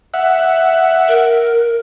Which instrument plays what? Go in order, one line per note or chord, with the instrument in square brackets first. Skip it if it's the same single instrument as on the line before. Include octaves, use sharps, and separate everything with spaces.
[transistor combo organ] E5 F#5
[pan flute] A#4